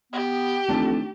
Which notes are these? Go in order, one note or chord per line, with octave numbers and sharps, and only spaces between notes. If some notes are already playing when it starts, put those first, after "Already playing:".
B3 G4
F2 D#3 E3 A3 D4 A5